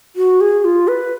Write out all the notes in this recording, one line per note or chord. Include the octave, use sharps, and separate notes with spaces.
F#4
G#4
F4
B4